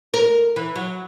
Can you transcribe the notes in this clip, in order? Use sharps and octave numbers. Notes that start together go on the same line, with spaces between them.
A#4
E3
F#3